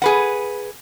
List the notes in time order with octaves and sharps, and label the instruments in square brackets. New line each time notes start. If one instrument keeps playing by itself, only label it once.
[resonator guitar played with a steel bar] G#4 B4 F#5